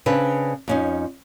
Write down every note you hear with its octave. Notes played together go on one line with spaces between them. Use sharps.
C#3 C4 D4 B4
F2 C#4 D#4